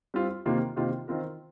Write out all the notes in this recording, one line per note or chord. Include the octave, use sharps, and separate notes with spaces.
G3 C4 F4
C3 D#3 A#3 F4
C3 D#3 A#3 F4
D#3 C4 F4 A#4